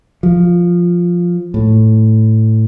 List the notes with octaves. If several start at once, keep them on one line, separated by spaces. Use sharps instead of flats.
F3
A2